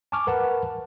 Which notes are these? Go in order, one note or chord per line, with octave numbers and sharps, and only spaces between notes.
G#5 A5 C#6 D6 F6
A#4 B4 F#5 A5